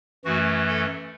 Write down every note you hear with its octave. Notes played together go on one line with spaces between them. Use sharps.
F#2 E3 A3 F#4
A4